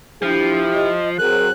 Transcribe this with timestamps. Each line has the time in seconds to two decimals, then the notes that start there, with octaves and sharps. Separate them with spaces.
0.22 F3 D4 E4 G4
0.74 D#5
1.18 F#3 C4 G#4 A#4 F#6